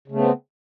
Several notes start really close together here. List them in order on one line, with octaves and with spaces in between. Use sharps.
C#3 A3 B3 C4